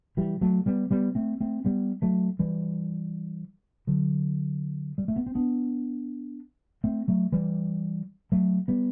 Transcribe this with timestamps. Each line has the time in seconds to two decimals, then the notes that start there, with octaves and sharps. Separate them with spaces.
0.17 E3 G3
0.41 F#3 A3
0.66 G3 B3
0.91 G3 B3
1.15 A3 C4
1.40 A3 C4
1.65 G3 B3
2.02 F#3 A3
2.39 E3 G3
3.87 D3 F#3
4.98 G3
5.08 A3
5.16 B3
5.27 C4
5.35 B3 D4
6.84 A3 C4
7.08 F#3 A3
7.32 E3 G3
8.32 F#3 A3
8.68 G3 B3